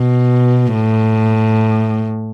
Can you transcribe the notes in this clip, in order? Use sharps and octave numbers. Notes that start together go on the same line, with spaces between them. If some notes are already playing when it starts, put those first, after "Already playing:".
Already playing: B2
A2